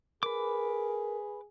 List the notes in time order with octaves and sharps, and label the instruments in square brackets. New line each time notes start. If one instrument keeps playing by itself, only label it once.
[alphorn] G#4 [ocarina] A#4 [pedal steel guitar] B4 D6